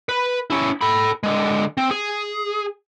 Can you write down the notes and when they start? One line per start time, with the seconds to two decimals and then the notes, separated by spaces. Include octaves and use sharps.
0.09 B4
0.50 C#4 E4
0.81 A4 B5
1.23 D3 G#3
1.77 C4
1.91 G#4